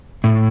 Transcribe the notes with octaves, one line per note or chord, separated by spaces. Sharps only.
A2